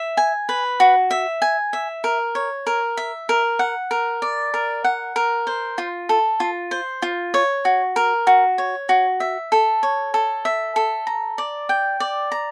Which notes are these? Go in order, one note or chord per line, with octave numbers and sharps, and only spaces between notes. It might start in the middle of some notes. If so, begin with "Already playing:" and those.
Already playing: E5
G#5
B4
F#4
E5
G#5
E5
A#4
C#5
A#4
E5
A#4
F#5
A#4
D5
A#4
F#5
A#4
C5
F4
A4
F4
C5
F4
C#5
F#4
A#4
F#4
C#5
F#4
E5
A4
C#5
A4
E5
A4
A#5
D5
G5
D5
A#5